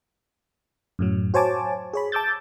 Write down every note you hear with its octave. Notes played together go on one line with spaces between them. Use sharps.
F#2 A2 F#3
F#4 C5 C#5 G#5 A5 D6
G#4 C#5 B5
A5 D6 E6 G6 A6